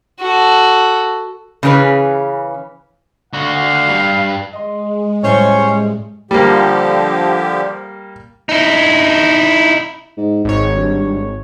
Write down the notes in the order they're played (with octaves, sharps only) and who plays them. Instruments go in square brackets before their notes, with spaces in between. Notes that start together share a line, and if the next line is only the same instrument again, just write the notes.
[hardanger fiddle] F#4 A4
[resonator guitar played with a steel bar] C#3 E3 C#4 G#4 B4
[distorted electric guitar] D3 F#4 [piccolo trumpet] F5
[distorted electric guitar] G2
[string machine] G#3 [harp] D#5 C6
[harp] A2 G3 [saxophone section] C#4 C5 C#5
[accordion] D3 F3 G4 [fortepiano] G3 A#3
[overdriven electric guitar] D#4 E4
[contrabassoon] G#2
[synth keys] G#1 C#5 [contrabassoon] G#2
[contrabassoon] G2